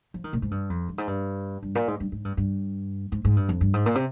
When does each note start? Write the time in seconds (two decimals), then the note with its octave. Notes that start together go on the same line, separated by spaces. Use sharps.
0.14 F3
0.24 D#3
0.33 A#2
0.42 G#2
0.51 G2
0.70 F2
0.89 G2
0.98 G#2
1.07 G2
1.63 G2
1.75 A#2
1.88 G#2
2.00 G2
2.12 G#2
2.25 G2
2.37 G2
3.12 G#2
3.25 G#2
3.36 G2
3.49 F2
3.61 G2
3.74 G#2
3.86 A#2
3.95 C3